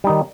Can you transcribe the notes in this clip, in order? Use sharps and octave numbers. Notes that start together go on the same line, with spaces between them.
D#3 G3 D#4